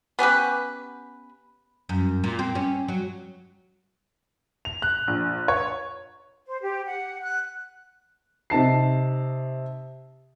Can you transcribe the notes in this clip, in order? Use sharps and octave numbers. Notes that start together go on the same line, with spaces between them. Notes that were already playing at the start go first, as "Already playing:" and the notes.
B3 C#4 G4 B4
F#2
A#2
C4
C#4
F#3
F7
F#6
A#1
C#5
C5
G4
F#5
F#6
C3 D#4 A5 C7